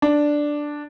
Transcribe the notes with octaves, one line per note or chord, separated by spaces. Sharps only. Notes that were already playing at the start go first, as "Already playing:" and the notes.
D4